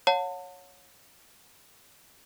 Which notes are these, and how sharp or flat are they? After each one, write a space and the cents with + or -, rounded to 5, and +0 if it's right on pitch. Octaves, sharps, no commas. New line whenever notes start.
C#5 +0 F#5 -45 A5 +30